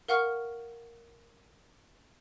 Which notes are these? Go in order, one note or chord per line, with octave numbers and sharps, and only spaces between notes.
A#4 F5 F#5 C#6 F6